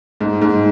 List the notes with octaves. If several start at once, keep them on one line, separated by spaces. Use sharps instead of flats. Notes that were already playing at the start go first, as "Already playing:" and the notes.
G#2
G#2